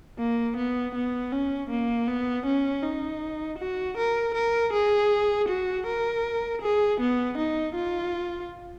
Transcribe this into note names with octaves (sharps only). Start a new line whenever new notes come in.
A#3
B3
B3
C#4
A#3
B3
C#4
D#4
F#4
A#4
A#4
G#4
F#4
A#4
G#4
B3
D#4
F4